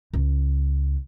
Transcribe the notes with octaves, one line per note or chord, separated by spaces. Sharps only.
C#2